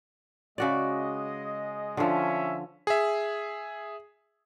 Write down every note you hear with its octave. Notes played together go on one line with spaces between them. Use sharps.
C#3 G#3 F#4 D5 D#5
D3 F3 C#4 E5
G#4 E5